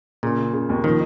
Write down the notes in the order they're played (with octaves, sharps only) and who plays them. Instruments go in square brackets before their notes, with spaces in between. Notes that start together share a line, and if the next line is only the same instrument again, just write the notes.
[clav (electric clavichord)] A#2 [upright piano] C#3
[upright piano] C#3
C#3
D#2
[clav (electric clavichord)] D#3 [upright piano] F3